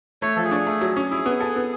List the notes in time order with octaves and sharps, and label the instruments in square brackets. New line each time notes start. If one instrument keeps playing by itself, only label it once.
[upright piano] A3 [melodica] C#5
[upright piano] F3 [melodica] A4
[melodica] G#4
[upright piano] D4
A3
F#3
C#4
[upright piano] E4 [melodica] G#4
[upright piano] B3
A4
B3